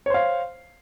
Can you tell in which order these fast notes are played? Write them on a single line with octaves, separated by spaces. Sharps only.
C#5 C5 F5